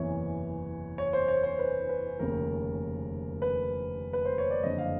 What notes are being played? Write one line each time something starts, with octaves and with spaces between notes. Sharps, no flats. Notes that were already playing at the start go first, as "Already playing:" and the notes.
Already playing: F#1 E2 C3 E3 C#5
C#5
C5
C#5
C5
B4
B4
F1 D#2 C#3 A#4
B4
B4
C5
C#5
D5
F#1 F2 D3 D#5
F5